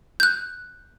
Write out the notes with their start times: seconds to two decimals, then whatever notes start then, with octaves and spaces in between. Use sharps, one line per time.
0.20 F#6 G6